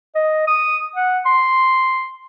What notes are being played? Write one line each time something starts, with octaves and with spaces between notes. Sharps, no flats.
D#5
D#6
F#5
C6